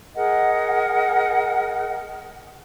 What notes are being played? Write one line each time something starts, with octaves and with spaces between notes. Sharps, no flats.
G#4 A#4 D#5 F#5